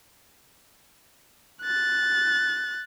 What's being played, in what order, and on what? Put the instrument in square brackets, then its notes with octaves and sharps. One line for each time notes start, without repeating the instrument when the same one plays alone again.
[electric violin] F#6 A6